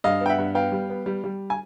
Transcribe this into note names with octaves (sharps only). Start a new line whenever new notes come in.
G2 D#5 F5
B3 G5
E5 F#5
G2
B3 F5 G5
G3
B3
G3
G3
G#5